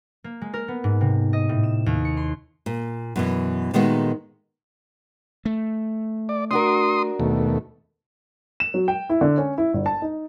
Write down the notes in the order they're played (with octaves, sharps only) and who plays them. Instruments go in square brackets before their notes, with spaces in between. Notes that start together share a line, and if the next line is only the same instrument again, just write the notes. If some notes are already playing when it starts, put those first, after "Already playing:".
[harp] A#3
G#3
A#4
B3
G#2
C3
D#5
A2
E7
D#2
C#7
C6
[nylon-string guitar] A#2
F#2 B2 E3
A#2 D#3 G#3 A3 B3 F#4
[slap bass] A3
[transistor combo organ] D5
[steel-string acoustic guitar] D4 F#4 A#4 [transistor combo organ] C6 D#6
[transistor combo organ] D#2 B2 A3
[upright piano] E7
F#3
G5
E4
D3
C#4
E4
G1
A5
D#4